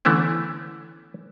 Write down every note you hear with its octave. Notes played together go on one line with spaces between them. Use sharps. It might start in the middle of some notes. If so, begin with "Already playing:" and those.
D3 E3 A3 B3 C#4 E4